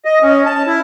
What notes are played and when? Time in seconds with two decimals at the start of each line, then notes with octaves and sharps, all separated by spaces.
0.05 D#5
0.23 C#4
0.45 A5
0.67 E4